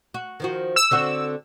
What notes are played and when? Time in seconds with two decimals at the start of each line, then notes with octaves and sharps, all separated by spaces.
0.14 F#4
0.40 D#3 F3 F#4
0.76 E6
0.91 D3 C4 F#4